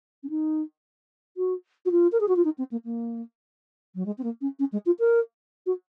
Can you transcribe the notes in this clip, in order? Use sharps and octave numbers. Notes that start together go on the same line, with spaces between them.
C#4
D#4
F#4
F#4
F4
A#4
G#4
F#4
F4
D#4
C4
A#3
A#3
F#3
G#3
C4
A#3
C#4
C#4
G#3
F4
A#4
F#4